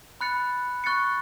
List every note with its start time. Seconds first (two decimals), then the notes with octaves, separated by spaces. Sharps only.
0.21 B5 F#6 A6 C#7
0.84 C#6 F#6 A6 C#7